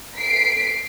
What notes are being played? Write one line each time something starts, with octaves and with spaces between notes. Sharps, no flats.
B6 C7 D7